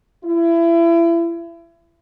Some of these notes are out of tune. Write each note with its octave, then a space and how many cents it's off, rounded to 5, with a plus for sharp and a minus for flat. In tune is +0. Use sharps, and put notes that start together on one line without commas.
E4 +30